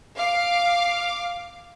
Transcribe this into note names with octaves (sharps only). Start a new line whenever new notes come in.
F5 D6